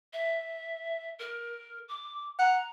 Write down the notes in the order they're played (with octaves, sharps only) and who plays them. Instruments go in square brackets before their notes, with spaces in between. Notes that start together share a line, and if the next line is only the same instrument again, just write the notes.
[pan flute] E5
A#4
D6
[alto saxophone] F#5 [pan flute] A#5